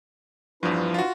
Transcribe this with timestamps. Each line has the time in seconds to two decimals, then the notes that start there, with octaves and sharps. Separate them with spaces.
0.63 E2 G2 F3 D4 E4 B4
0.94 F4 F#4